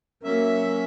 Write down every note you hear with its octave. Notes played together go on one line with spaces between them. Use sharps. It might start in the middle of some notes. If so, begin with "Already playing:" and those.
F#3 A#3 C#4 E5